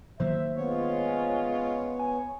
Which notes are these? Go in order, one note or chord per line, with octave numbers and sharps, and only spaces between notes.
D#3 F#3 A#3 C5 E5
G#3 B3 C#4 F4 C#5
G#5